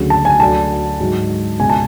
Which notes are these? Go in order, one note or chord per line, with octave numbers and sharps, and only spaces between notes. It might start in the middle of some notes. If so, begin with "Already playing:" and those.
Already playing: D2 C#3 F#3
A5
G#5
D2 D3 F#3 A5
G#2 F#3
C#2 B2 G#3 G#5
A5